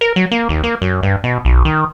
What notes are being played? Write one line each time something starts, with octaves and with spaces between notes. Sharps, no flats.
A#4
F#3
A#3
D#2
A#3
F#2
G2
B2
B1
D#3